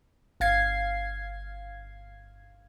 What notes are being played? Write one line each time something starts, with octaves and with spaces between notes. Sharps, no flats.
G1 F5 G#6 C7